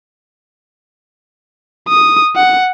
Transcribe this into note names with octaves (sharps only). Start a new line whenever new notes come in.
D#6
F#5